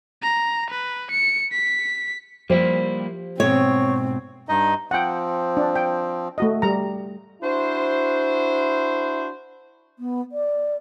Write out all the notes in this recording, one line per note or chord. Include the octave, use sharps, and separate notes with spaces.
A#5
B4
C#7
B6
F3 G3 A#3 E4 G4 C5
G#2 B2 C4 C#5
G2 D#4 D#5
F3 C4 F#5 G5
D4
G5
A3 F#4 D#5
G3 A#5
D4 E4 F#4 C5
B3
D5